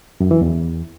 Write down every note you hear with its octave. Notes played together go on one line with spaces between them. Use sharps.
F#2
E3
E2